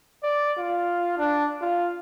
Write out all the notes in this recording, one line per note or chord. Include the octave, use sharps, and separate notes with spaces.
D5
F4
D4
F4